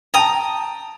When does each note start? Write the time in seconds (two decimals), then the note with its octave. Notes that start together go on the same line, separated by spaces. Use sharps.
0.14 G5 A5 A#5 D#6